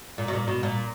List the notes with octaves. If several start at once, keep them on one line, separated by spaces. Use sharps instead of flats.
A#2
B2
A#2
B2
A#2